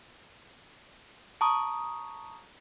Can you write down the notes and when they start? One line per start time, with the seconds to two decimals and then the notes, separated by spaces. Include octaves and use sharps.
1.41 A5 A#5 C#6 D#6